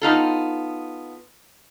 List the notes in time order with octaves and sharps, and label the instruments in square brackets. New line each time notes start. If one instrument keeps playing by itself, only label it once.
[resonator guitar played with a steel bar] B3 D#4 F4 A4